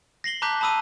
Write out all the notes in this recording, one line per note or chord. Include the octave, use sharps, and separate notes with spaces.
A#6 C7 F#7 G7
A5 A#5 D6 F#6 G6 B6
A5 B5 D#6 E6 D#7